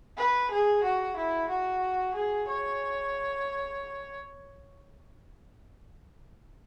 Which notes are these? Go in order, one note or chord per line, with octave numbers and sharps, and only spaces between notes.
B4
G#4
F#4
E4
F#4
G#4
C#5